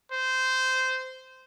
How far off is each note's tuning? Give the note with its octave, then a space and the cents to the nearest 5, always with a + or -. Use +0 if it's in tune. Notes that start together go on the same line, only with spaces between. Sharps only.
C5 -15